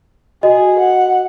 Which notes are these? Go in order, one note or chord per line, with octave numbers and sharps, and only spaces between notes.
F#4 G#4 D#5
F#5